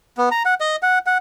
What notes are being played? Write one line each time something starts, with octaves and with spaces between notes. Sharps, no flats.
B3
A#5
F#5
D#5
F#5
F#5